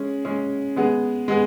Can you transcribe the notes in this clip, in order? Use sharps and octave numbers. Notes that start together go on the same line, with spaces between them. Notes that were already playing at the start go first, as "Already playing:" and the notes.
Already playing: G#3 C#4 G#4
G#3 C#4 G#4
G#3 B3 G#4
G#3 B3 G#4